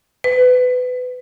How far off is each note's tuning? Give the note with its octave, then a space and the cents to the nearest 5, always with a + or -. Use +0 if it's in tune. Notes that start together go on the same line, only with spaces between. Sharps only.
B4 +25